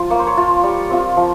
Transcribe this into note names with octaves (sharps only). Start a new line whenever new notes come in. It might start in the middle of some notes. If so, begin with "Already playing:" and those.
Already playing: F3 F4
A#3 C#5
C5
C#5
F4
G3
C4 F4
F3